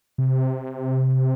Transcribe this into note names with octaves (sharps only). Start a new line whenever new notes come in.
C3